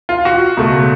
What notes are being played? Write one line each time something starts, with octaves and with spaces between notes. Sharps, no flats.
F4
F#4
C#2 B2 A3